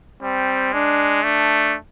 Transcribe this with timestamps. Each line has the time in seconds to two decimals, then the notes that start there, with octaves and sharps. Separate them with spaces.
0.22 G3 C4
0.73 G#3 D4
1.23 A3 D4